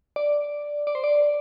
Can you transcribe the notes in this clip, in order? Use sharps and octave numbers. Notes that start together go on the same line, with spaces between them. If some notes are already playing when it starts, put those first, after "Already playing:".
D5
D5
C5
D5